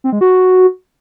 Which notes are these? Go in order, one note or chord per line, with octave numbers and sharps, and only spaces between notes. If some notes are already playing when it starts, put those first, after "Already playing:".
C4
G#3
F#4